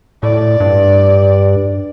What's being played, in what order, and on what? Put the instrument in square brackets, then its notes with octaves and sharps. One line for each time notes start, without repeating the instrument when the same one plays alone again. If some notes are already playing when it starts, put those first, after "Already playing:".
[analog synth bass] A2 [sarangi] D5
[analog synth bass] G2